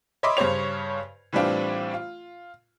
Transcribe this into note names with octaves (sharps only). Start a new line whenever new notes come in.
C#5 D#5 E5 B5 C6 D6
G2 C#3 C5 C#5 F7
A2 E3 G3 C4 D4 F4
F4